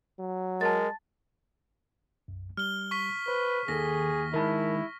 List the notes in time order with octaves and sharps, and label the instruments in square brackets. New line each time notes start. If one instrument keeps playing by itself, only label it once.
[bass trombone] F#3
[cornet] G#3 [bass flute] A#4 [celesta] A5 A6
[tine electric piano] B1 F#2
[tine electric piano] G3 [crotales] F6 G7
[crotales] C#6 B6 G7
[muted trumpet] B4 [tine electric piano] C5
[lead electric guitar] D#2 [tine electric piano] D#3 A4 [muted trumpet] G#4 [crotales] A#6
[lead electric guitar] D#3 G#3 [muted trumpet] E4 [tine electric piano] A#4 A5 B5